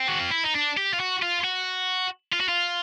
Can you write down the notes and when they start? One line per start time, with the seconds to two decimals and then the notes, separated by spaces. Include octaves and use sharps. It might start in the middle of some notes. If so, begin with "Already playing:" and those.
Already playing: C4
0.08 F#4
0.20 F4
0.32 E4
0.44 D#4
0.55 D4
0.77 G4
0.94 F4
1.00 F#4
1.23 F4
1.44 F#4
2.32 F4
2.40 F#4
2.48 F4